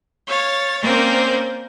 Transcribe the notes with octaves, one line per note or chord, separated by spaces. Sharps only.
C#5 F5 A6
A#3 C4 C#4 A#4 C5 D5